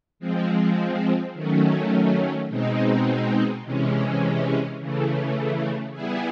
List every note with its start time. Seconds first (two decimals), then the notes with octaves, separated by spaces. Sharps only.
0.20 F3 G#3 C4
1.34 D#3 F#3 A3 C#4
2.49 B2 G#3 C4 D#4
3.63 C3 E3 G#3 C#4
4.79 C#3 E3 A3
5.92 G3 B3 E4 G#4